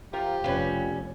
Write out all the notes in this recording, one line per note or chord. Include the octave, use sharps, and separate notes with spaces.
F3 F4 G4 A#4
F1 G3 C#4 F4 B4